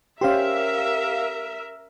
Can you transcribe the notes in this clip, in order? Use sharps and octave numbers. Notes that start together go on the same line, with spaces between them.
C#4 G4 A#4 C5 E5 F5 C6